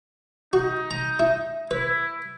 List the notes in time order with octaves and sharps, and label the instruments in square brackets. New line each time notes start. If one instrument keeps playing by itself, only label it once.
[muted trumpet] D#4 [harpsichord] F#4
[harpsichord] A#5
E4
[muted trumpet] E4 [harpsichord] B4